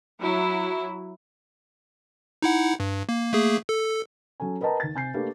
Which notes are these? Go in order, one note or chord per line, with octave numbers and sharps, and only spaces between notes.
F#3 E4
D#4 E4 F#5
G2
A#3
A3 A#3 G#4
A4
F#3 C#4 A4 G#5
A#4 B4 D#5 G5 A5 A#5
D#2 A6
C3 G#5 G6 C7
A3 A#3 D4 G4 B4